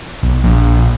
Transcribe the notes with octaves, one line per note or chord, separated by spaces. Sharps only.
B1
A#1